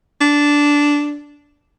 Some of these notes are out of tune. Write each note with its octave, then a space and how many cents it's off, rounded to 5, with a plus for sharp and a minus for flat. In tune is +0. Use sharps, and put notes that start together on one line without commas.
D4 -10